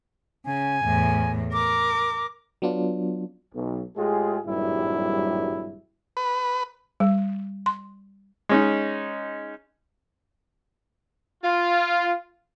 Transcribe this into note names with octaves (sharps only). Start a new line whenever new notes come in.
C#3 G#5
E2 A2
A#4 D6
F#3 B3 D4 F4
B1
A2 G#3 F4 G4 G#4
G#1 G2 A#2 F#3 G3 E4
B4
G3
C6
G#3 C#4 D#4
F4